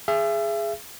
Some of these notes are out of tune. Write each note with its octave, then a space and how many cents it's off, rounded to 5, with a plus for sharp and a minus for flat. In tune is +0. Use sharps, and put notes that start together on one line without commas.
G#4 +0 E5 +35